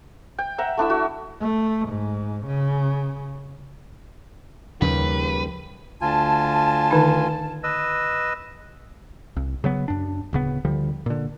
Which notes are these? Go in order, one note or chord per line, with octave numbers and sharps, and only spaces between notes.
G5
E5 F#5 A#5
A3 D4 E4 E6
F#4
A3
G#2
C#3
D#2 C#3 F3 G3 B4
D2 F4 G#5 A5
D3 D#3 D#4
B4 D#5 E6
C2
C#3 F#3 B3
F#2 D4
D1 C#3 B3
D2 D3 F3 G3
A#2 D3